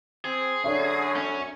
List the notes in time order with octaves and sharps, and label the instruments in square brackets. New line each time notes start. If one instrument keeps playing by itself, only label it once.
[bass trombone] C4 [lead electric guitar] G#4
[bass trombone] F#2 [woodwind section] D3 C#5 [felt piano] D4 D5 E5
[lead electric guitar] C#4